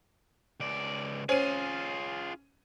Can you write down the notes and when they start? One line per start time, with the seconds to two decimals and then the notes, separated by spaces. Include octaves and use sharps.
0.60 C#2 D5
1.29 C#4 F4 G#4 C5 D#7